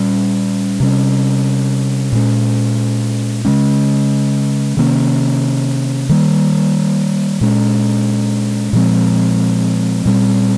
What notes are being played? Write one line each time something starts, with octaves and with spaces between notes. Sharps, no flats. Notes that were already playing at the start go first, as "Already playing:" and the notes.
Already playing: A#2 G3 C#4
C3 G3 C#4
A#2 G#3 C#4
C#3 G#3 C#4
C3 D#3 A#3 C#4
D#3 G3 A#3
A#2 G#3 C#4
A#2 F3 G#3 C4
A#2 G3 C4